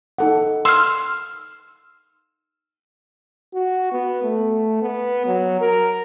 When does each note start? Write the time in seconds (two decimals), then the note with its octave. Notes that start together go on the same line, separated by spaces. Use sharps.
0.18 D#4 A4 F#5
0.65 C6 E6 F6
3.54 F#4
3.92 B3
4.23 A3
4.82 B3
5.26 F#3
5.61 A#4